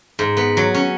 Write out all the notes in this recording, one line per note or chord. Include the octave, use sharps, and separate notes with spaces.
G#2
B3
F#3
C#4